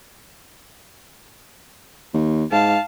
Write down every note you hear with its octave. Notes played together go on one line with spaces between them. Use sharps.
D#2
G#2 F5 A5